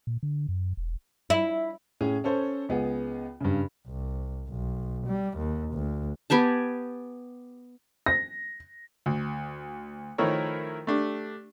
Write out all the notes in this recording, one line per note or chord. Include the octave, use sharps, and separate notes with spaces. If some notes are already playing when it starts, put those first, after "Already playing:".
A#2
D3
F#2
E1
E4
A2 C#4 G#4
C#4 A4 C5 C#5
C#2 B3 G#4
G2 C#3
C2
B1
G3
D#2
D2
B3 G4 G#5 A5
A#6
D2
D#3 F3 A3 E4 A#4 C#5
A3 D4 G4